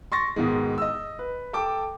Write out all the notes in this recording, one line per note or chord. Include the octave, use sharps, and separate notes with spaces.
C6 C#6 A6 A#6
G#2 B2 D#3 G#3
D#5 E6
B4
A4 G5 A5 D6